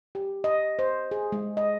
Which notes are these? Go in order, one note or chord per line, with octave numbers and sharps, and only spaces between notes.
G4
D#5
C5
G#4
G#3
D#5